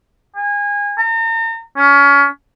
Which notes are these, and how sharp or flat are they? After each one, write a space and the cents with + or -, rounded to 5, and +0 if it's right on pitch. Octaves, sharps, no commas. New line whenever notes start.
G#5 -25
A#5 -40
C#4 +25